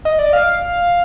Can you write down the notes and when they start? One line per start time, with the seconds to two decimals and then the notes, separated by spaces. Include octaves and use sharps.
0.05 D#5
0.19 D5
0.33 F5